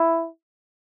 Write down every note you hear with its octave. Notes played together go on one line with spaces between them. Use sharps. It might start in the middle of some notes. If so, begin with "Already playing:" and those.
Already playing: E4